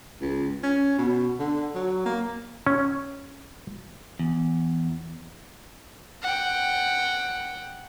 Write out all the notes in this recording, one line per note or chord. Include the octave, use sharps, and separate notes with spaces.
C#2
C#4
B2
D3
F#3
A#3
C#4
E2
F#5 G5